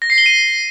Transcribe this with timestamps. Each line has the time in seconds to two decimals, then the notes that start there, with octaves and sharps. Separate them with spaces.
0.02 A#6
0.10 C7
0.18 G7
0.26 D#7